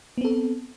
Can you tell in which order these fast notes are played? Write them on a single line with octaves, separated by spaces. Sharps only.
B3 C4 A4